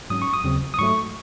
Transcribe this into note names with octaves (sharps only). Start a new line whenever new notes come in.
G#2 F#3 C#4 D#6
C#6
D#6
D#2 C#3 F#3 C4
D#6
G#2 F#3 A3 C#6